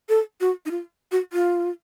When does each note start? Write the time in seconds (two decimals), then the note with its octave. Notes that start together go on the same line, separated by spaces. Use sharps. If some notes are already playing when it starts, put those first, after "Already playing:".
0.09 A4
0.41 F#4
0.66 D#4
0.71 F4
1.12 F#4
1.33 F4